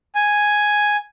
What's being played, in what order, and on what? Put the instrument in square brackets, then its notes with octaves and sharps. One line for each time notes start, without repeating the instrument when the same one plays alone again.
[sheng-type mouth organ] G#5